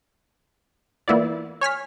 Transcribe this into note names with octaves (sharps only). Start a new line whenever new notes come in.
E3 A#3 B3 E4 F4 D5
C#5 G#5 F6 B6